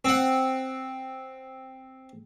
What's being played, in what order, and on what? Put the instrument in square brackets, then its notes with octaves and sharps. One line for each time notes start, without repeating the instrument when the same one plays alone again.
[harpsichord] C4 F#5